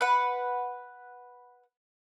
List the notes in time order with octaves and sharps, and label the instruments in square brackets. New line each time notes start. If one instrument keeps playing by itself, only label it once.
[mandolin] B4 F#5